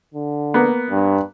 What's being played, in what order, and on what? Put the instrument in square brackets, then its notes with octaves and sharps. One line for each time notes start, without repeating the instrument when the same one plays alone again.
[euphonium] D3
[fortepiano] A#3 B3
[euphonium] G2